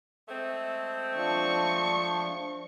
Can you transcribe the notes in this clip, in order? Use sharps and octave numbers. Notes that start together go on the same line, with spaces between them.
G#3 A3 C4
F3 D4 C#6